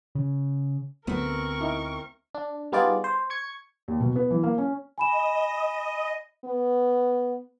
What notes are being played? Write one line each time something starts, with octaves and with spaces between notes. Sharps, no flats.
C#3
D2 A3 B3 C4 A#4 C#6
D#4 E4
D4
G3 B3 D#4 F4 G#4 D5
C5
C#6 G#6 C#7
D#2
B2
B3
E3
A#3
C#4
D#5 G#5 B5 E7
B3